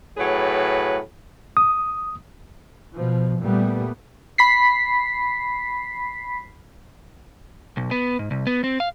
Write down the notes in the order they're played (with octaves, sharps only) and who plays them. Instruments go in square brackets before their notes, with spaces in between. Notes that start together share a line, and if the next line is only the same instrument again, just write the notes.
[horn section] A2 F#3 G#4 B4
[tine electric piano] D#6
[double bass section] B2 F3
A#2 G3 A3 B3
[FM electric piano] B5 B6 C7
[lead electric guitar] B1
B3
G#2
C2
B3
C4
F5